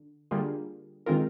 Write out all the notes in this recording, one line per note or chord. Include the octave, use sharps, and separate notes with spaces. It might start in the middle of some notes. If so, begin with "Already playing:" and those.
Already playing: D3
D3 G3 A#3 F4 G#4
D#3 G#3 C4 F4 A#4